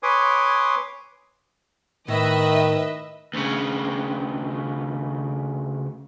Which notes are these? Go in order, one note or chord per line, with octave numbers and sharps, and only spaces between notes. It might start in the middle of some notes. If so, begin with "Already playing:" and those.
B4 C#5 G#5 C6 D6 D#6
A2 D#3 B4 D#5 E5
D2 C#3